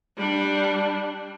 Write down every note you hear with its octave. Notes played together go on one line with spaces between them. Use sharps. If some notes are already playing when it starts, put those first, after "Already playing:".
G3 D4